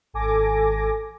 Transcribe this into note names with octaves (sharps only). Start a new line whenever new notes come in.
G#1 A4 G#5 D6 A#6